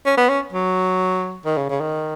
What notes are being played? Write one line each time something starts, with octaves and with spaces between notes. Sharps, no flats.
C#4
B3
C#4
F#3
D#3
C#3
C#3
D#3